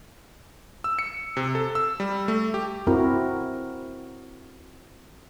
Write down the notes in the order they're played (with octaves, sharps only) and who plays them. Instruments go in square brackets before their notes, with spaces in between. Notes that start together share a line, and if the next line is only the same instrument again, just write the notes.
[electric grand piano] E6
C#7
C3
A4
E6
G3
A3
G4
[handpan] C4 E4 F#4 A#4